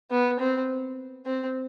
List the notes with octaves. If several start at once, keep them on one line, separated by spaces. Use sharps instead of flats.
B3
C4
C4